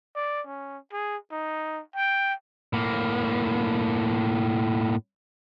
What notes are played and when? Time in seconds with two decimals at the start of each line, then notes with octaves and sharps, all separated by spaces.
0.16 D5
0.47 C#4
0.93 G#4
1.31 D#4
1.96 G5
2.73 A2 A#3